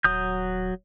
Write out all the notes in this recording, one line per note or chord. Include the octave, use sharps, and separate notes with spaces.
D#1 F#3 D#6 G6